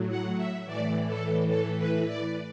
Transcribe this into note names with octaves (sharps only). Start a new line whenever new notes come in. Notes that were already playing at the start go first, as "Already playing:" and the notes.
Already playing: A2 F#3
F#5
E5
A2 E3 D5
A4
A4
B4
D5